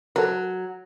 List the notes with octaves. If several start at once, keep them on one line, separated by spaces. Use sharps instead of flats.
F#3 A4 A#4